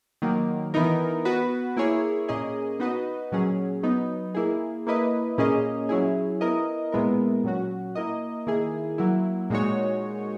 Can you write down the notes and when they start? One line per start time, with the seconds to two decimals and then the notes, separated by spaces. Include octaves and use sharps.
0.22 D#3 F#3 A#3
0.74 E3 B3 D#4 A#4
1.25 B3 F#4 B4
1.77 A#3 E4 G#4 C#5
2.28 A#2 A#3 C#4 G#4 D#5
2.79 B3 D#4 F#4 B4 D#5
3.32 A#2 F#3 C#4 G#4
3.83 F#3 B3 D#4
4.34 A#3 E4 G#4
4.87 A#3 E4 B4 D#5
5.38 A#2 A#3 C#4 G#4 D#5
5.89 F#3 C#4 E4 G#4
6.41 B3 E4 A#4 D#5
6.92 A#2 G#3 B3 E4 A#4
7.44 A#2 F#3 C#4 F#4
7.95 A#3 E4 A#4 D#5
8.47 D#3 A#3 E4 G#4
8.98 F#3 A#3 E4
9.50 A#2 G#3 D#4 F#4 C#5